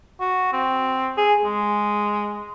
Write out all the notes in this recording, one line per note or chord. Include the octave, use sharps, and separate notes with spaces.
F#4
C4
G#4
G#3